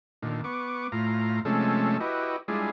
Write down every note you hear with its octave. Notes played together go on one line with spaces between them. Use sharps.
A#2 D3 D#3
B3 C#6 D6
A2 F4 A#5
C3 F3 G#3 A3 C#4 A4
E4 F#4 G4 B4 D#5
G3 G#3 D4 E4 F4 G#4